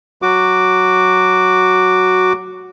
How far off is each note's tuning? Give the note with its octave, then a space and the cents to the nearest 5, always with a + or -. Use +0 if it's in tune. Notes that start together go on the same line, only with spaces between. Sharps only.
F#3 +0 F#4 +0 D6 +0